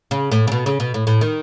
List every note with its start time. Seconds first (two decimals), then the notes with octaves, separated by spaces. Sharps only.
0.11 C#3
0.31 A2
0.47 C#3
0.52 B2
0.66 C#3
0.80 B2
0.94 A2
1.07 A2
1.21 D#3